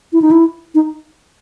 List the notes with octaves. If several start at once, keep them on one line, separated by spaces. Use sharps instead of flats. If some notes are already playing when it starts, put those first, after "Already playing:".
E4
D#4
E4
D#4